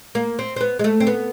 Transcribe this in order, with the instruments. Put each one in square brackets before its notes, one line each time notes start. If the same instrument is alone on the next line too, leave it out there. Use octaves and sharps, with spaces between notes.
[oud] A#3
C4
C4
B3
G#3
A3
C4
B3